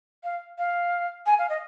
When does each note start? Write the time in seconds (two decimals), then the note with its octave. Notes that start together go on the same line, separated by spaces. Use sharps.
0.24 F5
0.58 F5
1.26 G#5
1.39 F5
1.50 D#5